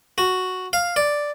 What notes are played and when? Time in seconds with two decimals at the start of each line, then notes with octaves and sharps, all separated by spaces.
0.18 F#4
0.73 F5
0.96 D5